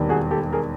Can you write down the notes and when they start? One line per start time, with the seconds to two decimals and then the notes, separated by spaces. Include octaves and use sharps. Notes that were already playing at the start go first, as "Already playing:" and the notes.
Already playing: E1 D#2 D#3 G3
0.09 F#4 G#4
0.31 G4 A4
0.53 G#4 A#4